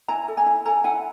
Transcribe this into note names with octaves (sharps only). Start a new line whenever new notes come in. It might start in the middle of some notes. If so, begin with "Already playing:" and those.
E4 G#5 A#5
A4
G#5 A#5
E4
A4 G#5 A#5
E4 F#5 G#5